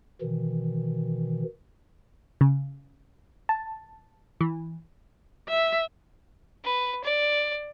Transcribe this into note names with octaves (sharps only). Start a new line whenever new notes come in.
B2 D#3 E3
C#3
A5
E3
E5
B4
D5